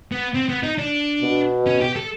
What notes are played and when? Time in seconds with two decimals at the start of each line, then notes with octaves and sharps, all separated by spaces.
0.12 B3
0.34 C4
0.49 B3
0.63 D#4
0.78 D4
1.22 B2
1.66 C#4
1.81 G4
1.96 A4